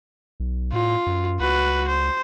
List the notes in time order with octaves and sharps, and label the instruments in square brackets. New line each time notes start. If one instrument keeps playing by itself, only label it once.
[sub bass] B1
[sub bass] A2 [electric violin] F4
[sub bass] F#2
[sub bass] C#2 [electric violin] F#4 B4
[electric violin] C5